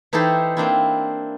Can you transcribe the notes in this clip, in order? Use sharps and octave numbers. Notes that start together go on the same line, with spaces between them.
E3 D#4 E4 G4 A4 C5
A#3 C4 D4 E4